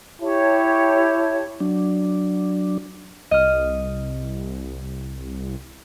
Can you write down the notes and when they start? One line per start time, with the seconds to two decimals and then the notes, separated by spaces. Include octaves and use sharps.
0.21 E4 G4 C#5 A5
1.60 F#3 D4
3.31 C2 D#5 F6